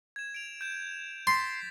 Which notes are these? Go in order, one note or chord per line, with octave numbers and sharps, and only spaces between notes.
G#6 E7
D7 F7
G6 E7
C6 A6 B6